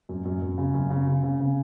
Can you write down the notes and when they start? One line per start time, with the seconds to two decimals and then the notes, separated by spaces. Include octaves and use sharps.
0.09 F#2
0.25 F#2
0.42 F#2
0.58 C#3
0.74 F#2
0.90 C#3
1.07 C#3
1.23 C#3
1.40 C#3